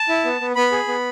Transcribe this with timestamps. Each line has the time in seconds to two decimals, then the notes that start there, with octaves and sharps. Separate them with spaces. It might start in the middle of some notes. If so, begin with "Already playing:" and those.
Already playing: A5
0.09 E4
0.25 B3
0.41 B3
0.56 B3 B5
0.72 G#4
0.88 B3